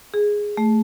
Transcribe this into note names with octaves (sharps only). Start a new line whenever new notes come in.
G#4
A3